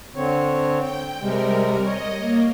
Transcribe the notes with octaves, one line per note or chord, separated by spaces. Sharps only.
D3 C4 C#5
G5
C3 G3 G#3 A#4
C#5 D#5
A#3